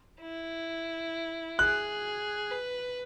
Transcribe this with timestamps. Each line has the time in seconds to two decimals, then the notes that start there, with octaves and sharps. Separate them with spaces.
0.21 E4
1.59 G#4 F#6
2.51 B4